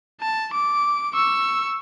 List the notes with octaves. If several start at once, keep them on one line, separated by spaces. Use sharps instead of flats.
A5
D6
C#6 E6